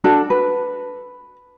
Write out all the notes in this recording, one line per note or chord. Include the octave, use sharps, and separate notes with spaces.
D4 F#4 A4
B4